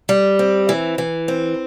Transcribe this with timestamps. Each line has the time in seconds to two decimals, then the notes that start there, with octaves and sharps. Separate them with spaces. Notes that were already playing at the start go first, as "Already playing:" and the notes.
0.09 G3
0.39 C4
0.69 E3
0.98 E3
1.28 C4